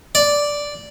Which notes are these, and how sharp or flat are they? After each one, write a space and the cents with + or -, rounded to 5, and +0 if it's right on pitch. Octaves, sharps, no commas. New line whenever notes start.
D5 -5